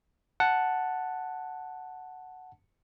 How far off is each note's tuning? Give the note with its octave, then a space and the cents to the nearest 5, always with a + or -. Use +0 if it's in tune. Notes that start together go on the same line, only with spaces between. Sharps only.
F#5 +0 A5 +0